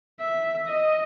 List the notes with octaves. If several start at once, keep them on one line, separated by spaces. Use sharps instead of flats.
E5
D#5